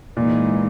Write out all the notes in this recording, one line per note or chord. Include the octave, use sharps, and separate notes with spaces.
A#2 E3 G#3 D#4